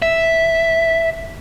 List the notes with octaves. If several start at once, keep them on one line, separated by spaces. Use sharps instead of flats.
E5